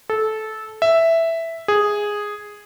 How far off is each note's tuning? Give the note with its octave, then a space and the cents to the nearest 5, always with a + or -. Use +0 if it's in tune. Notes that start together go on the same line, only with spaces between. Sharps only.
A4 -15
E5 +0
G#4 -5